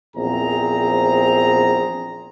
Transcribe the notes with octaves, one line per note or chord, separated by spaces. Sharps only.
A#1 E2 C4 G#4 A#5